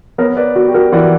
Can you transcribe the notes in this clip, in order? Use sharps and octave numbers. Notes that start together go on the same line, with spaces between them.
B3 A#4 C#5
B4 D5
B3 F#4
G4
F#4 A#4
E3 D5 F#5